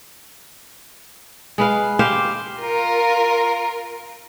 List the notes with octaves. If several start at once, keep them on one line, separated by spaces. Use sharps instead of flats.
G#3 B4 F5
G4 C5 F5
F4 A#4